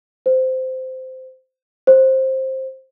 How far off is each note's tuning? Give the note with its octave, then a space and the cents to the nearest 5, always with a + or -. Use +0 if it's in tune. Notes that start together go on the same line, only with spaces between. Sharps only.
C5 -15
C5 +15